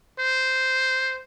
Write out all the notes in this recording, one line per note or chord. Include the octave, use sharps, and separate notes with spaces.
C5